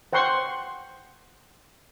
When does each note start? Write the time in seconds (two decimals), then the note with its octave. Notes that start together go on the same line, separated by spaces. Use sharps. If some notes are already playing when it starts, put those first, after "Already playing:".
0.13 C5 F#5 G5 C6 C#6